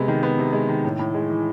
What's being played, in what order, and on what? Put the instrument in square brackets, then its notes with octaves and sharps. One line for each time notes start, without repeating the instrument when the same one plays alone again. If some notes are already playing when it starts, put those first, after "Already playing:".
Already playing: [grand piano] C3 G#3 B3
D#3
B3
C3
G#3
D#3
A2
A2
G#3
E3